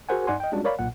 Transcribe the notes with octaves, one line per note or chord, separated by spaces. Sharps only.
F#4 G#4 A#4 C5 F#5 G#5
G2 D#4 D5 F#5 G#5 C6
D#5 G5
G3 G#3 C#4 D4 F4 F#4
A#4 C#5 D5 F5 B5
B1 A#2 F#5